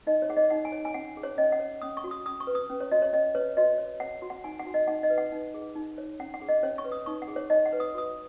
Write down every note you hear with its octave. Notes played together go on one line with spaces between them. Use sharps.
D#4 D#5
C#5
G#4 F#5
D#5
D#4 F#5
G#5
C#5
G#5
C#4 F#5
G#4
C#5
C#4 D#5
F#5
C#5
C#4 D#6
C#6
F#4
D#6
C#4 D#6
C#6
B4
D#6
C#4
C#5
F#4 D#5
C#5
C#4 D#5
B4 C#5
F#4 D#5
C#5
C#5 F#5
F#4
F#5
D#4 G#5
F#5
F#4
D#5
D#4 F#5
D#5
B4
F#5
D#4
G#4
D#4
C#5
C#4 F#5
F#5
G#4
D#5
C#4 C#5
C#6
B4
D#6
D#4 C#6
F#5
G#4
C#5
D#4 D#5
F#5
B4
D#6
F#4 D#6